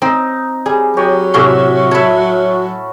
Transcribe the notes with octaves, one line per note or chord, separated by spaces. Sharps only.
C4 D#4
G3 G#4
F#3 G4 C#5 D#5
A2 C3 C#4 F#4 E5 C6
A4 C#5 E5 B5